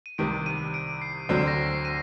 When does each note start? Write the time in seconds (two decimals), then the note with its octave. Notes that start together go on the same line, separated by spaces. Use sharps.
0.06 D#7
0.18 C2 C3 D#3 D7
0.46 D#7
0.74 D7
1.01 C7
1.29 D2 D3 F#3 C4 C7
1.48 A#6
1.67 C7
1.85 D#7